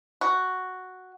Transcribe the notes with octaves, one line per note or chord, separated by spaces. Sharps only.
F#4